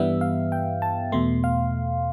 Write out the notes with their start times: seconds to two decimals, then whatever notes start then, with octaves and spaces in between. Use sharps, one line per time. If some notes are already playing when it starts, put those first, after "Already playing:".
Already playing: G2 E3 G3 B3 E5
0.21 F5
0.52 G5
0.82 A5
1.12 E2 B2 A3 C6
1.44 F5